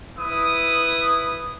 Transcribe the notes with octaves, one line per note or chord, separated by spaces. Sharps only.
E4 B4 D#6